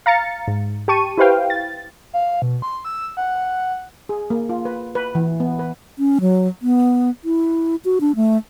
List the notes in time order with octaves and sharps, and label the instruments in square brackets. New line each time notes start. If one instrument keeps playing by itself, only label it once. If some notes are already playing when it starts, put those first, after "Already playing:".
[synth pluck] F5 A#5 A6 C#7
G#2
G4 A5 C#6 D#7
E4 G4 B4 C5 F5 G5
A6
[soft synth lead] F5
B2
C6
E6
F#5
F#5
[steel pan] G#4
A#3
F4
B4
B4
E3
B3
B4
[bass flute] C#4
F#3
B3
E4
F#4
D4
A3